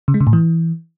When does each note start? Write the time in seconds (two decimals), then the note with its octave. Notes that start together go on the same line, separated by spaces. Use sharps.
0.08 C#3
0.14 G#3
0.21 C#3
0.27 A2
0.33 E3